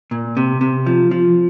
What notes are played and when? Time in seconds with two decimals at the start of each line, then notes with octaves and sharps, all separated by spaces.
0.11 A#2
0.37 C3
0.61 C3
0.86 F3
1.11 F3